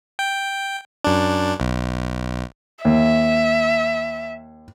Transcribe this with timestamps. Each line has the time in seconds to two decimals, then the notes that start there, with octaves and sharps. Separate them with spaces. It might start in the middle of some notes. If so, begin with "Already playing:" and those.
0.19 G5
1.04 F#2 D4
1.60 B1
2.85 D#2 E5